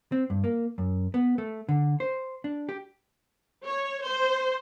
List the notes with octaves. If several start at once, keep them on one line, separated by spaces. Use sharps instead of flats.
C4
G2
A#3
F#2
B3
A3
D3
C5
D4
G4
C#5
C5